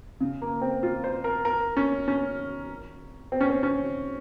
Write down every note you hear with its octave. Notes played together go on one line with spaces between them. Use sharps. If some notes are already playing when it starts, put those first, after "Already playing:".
C#3
A#3
C4
F4
C5
A#4
A#4
C#4
C#4
C4
C#4
C4
C#4